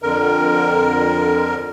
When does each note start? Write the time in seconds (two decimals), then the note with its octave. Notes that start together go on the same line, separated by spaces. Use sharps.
0.02 F2 D3 A#4